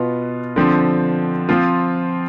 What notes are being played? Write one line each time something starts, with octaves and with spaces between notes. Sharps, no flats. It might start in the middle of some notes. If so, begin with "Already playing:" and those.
Already playing: B2 B3 F4
D3 F3 C4
F3 C4 F4